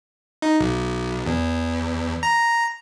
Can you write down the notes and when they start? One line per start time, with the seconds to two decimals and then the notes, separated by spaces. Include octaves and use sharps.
0.42 D#4
0.60 B1
1.26 E2
2.23 A#5